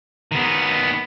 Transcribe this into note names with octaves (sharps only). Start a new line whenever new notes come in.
D#3 B3